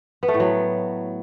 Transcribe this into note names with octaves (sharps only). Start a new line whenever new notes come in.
B3
A3
A2
F#3